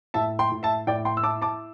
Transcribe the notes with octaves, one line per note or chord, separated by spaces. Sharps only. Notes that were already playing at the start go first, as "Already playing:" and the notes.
A2 E5 A5
G5 C6
A2
E5 A5
A2 D5 G5
G5 C6
E6
E4 A5 D6
A5 D6